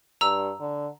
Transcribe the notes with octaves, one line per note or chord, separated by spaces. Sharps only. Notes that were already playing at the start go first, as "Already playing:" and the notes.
G2 A#5 E6
D3